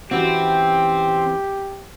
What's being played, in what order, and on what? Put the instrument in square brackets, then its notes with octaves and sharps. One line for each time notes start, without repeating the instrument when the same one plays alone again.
[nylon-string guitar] E3 C#4 F#4 [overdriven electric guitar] C4 [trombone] G4